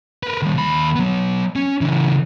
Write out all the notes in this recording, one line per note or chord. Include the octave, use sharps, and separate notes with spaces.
A#4 B4
D#3 G3
D#2 B5
F#3 B3
C#4
C#3 E3